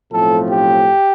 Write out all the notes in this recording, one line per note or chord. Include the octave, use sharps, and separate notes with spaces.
B1 A2 F3 A3 C4 A4
G4